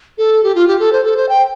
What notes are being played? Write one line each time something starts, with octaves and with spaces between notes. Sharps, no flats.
A4
G4
F4
G4
A4
C5
A4
C5
G5